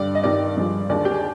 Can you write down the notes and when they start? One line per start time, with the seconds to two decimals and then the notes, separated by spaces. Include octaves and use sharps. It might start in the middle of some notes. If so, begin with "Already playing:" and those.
Already playing: G2 D3 G3 D5
0.15 D#5
0.24 G2 D#3 G3 D5
0.57 G2 F3 G#3
0.89 D#2 D3 G#3 D5
1.05 G4
1.11 G#4